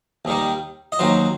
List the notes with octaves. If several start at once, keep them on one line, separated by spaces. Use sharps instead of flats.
D#2 D#3 G3
D#5
D#2 D#3 F#3 C5